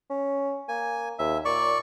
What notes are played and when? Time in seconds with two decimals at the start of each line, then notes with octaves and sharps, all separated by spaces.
0.10 C#4
0.69 A#3 G#5
1.19 D#2 E5
1.45 A#2 D5 C#6